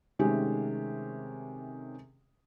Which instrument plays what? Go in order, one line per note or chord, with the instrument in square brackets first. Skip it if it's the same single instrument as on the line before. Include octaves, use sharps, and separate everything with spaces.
[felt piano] C3 D#3 G#3 A3 C#4 G4